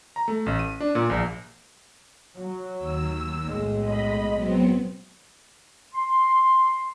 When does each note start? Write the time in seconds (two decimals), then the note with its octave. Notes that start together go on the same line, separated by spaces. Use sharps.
0.16 A#5
0.28 A3
0.46 A1
0.59 D#7
0.80 D4
0.95 A#2
1.10 A#1
2.35 F#3
2.77 D#2 E6
3.43 B1 A2 G#3
3.79 D#5 B5
4.33 F#3 B3 C4
5.95 C6